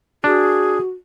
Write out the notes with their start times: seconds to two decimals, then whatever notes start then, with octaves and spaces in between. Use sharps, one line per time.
0.24 D4 F#4 G#4